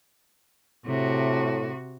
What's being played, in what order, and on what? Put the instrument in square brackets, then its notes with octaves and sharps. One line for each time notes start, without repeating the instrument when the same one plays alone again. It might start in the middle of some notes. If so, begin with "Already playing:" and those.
[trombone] A2 [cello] C3 F#4